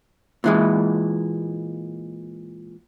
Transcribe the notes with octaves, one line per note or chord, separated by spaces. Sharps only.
A#2 E3 G#3